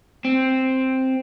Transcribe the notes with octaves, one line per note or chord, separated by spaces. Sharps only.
C4